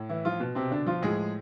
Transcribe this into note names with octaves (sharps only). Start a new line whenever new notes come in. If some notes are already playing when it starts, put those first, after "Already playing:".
Already playing: A2
E3 E4
F3 F4
B2
C3 C4
D3 D4
F3 F4
A2 F3 G#3 G#4